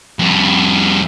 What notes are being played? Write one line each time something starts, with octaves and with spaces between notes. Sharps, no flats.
F2 G3